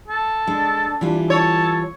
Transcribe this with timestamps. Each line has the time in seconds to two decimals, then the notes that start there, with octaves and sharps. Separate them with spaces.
0.08 A4
0.47 G#3 D4
1.01 E3 G3 F4
1.30 A4 C#5